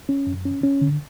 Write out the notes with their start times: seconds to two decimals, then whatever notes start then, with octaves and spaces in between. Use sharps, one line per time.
0.09 C#4
0.27 F#2
0.45 C#4
0.63 C#4
0.81 D3